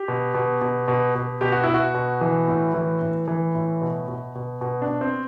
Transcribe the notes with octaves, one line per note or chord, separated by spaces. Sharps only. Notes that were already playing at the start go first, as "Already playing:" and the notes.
Already playing: G4
B2
B2
B2
B2
B2
B2 G4
F#4
B2 E4
F#4
B2
E3
A2
E3
A2
E3
A2
B2
B2
B2
B2
D4
B2
C4